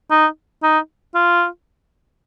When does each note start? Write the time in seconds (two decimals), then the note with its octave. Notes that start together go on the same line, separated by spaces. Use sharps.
0.11 D#4
0.63 D#4
1.15 F4